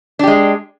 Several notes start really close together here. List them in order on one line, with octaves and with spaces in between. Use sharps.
D4 G4 G#3